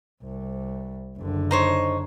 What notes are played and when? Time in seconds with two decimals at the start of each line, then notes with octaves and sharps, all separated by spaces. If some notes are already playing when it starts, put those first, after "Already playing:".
0.23 C2
1.17 F#1 D3
1.51 D#4 C5 C#5